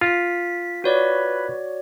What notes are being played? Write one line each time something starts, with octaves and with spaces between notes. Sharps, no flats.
F4 B6
F#4 B4 C#5 D5